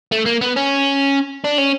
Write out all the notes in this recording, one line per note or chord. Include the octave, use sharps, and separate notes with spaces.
A3
A#3
B3
C#4
D4
C#4